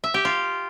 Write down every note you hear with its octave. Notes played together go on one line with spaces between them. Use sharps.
E5
G4
F4